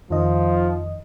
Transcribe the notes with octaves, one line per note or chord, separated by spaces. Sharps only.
F2 D#3 F3 D#5